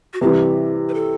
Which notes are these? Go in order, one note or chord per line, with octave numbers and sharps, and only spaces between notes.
F#4
C3 E3 G3 G4
B4
A4